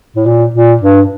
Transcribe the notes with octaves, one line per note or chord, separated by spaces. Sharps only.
A2
A#2
A#2
G2